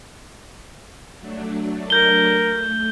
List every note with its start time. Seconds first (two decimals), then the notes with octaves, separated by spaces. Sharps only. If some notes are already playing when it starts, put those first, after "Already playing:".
1.20 F#3 A3 D4
1.90 A#4 G6 G7
2.35 A3